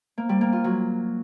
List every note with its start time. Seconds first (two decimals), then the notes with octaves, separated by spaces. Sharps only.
0.18 A#3
0.29 G3
0.41 A#3
0.53 F4
0.64 F#3